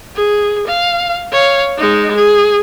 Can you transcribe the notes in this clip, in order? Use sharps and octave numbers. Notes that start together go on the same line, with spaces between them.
G#4
F5
C#5 F5
G#3 D#4
G#4